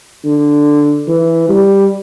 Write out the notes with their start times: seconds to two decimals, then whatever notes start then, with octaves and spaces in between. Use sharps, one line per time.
0.25 D3
1.07 E3
1.49 G3